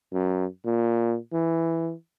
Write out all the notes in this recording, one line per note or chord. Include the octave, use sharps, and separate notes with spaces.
F#2
A#2
E3